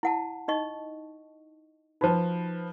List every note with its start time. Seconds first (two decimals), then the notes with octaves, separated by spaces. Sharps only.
0.03 E4 F#5 A5
0.48 D#4 D#5 C#6
2.01 F3 D#4 F#4 B4 A5